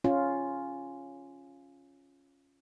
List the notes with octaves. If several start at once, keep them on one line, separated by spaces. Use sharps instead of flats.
C#4 F4